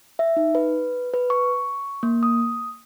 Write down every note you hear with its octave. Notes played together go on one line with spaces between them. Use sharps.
E5
D#4
B4
B4
C#6
A#3
D#6